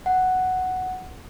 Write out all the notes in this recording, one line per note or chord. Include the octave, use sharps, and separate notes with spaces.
F#5